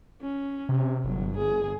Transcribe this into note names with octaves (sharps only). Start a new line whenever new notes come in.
C#4
C3
G1 F#3
G#4